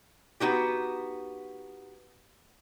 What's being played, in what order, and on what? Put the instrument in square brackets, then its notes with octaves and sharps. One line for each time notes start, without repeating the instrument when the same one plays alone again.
[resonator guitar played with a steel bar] B3 D#4 F#4 G4